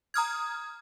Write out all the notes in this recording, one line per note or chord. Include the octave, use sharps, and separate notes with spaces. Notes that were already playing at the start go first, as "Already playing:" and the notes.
A#5 D#6 F6 G#6